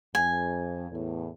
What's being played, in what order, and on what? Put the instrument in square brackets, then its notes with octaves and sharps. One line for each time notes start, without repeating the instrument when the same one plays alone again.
[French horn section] F2 [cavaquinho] G#5
[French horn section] E2 A2